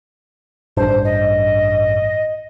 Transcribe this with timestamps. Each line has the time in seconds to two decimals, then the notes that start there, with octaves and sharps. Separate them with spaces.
0.77 A1 G2 D4 C5
1.05 D#5